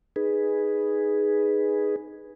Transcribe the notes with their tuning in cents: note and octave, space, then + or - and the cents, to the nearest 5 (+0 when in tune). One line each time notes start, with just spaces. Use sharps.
D#4 +0 G#4 +0 B4 +0